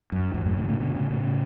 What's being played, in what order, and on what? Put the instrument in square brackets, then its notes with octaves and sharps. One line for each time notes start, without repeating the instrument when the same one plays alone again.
[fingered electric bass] F#2
E2 G#2
F#2 A2
A2 C#3
D3
A2 C#3
B2 D3
A2 C#3
A2 C#3